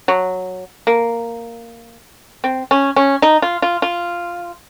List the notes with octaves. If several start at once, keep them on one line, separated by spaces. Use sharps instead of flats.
F#3
A#3
C4
C#4
C#4
D#4
F4
F4
F4